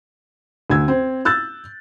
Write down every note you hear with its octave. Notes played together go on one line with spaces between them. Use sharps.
D2 E6 G#6
C4
E6 F#6 G6 A6